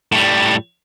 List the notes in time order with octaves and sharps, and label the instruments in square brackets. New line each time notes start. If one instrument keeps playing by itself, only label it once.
[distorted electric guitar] A2 G3